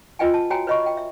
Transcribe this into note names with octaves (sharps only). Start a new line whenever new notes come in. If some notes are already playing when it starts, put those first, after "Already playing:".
F4 B4 D#5 G5 G#5
A5
F#4 C#5 G5 G#5 A#5
B4 C#5 D#5 B5 C#6
D#5 G5
E5